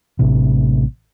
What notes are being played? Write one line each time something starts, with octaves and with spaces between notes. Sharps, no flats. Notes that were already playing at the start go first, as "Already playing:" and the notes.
A1 A2 C3